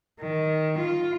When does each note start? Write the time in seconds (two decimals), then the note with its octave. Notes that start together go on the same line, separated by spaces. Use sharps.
0.20 D#3
0.79 F4